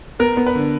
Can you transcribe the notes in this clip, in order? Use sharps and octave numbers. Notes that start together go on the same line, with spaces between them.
B3 A#4
B3
B4
D3